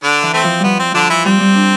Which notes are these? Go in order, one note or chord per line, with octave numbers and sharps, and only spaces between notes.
D3 D4
E3
A3 C4
F3
F3 G3 B3
C4
D3 F3 D4
E3 E4
G3 C4
G3
D4